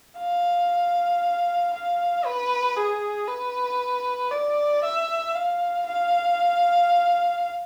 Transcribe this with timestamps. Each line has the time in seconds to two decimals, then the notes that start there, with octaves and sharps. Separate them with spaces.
0.18 F5
1.74 F5
2.26 B4
2.76 G#4
3.28 B4
4.31 D5
4.84 E5
5.35 F5
5.86 F5